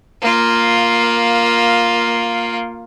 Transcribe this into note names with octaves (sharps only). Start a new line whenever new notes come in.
A#3 F4